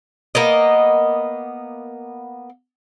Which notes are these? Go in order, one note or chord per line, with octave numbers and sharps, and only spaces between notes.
A#3 B3 D#5